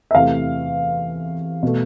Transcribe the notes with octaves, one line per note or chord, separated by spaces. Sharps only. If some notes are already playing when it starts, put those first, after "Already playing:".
E5
E2 C3 E3 A3 F5
B2 A3